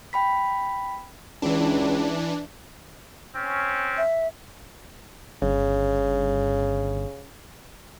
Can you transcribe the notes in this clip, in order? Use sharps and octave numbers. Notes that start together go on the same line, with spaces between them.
G5 B5 B6
C#2 E3 D4
C4 C#4
E5
G1 C#3